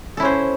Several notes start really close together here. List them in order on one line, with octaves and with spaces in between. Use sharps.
A4 E4 C#4 C5